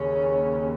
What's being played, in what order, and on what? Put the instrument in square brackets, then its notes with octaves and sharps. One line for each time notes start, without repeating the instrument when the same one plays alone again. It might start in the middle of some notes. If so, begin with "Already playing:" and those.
Already playing: [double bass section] D#2 C#3 C#4